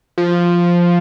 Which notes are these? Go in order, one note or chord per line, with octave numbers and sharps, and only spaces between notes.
F3